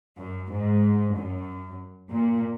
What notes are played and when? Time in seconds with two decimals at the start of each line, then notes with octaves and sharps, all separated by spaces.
0.18 F#2
0.51 G#2
1.15 F#2
2.11 A#2